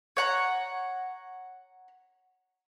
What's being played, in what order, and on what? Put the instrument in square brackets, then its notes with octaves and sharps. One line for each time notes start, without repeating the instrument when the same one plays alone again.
[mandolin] C#5 F#5 A#5